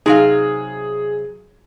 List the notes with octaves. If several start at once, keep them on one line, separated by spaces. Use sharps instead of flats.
C3 F#3 D#4 G#4 F5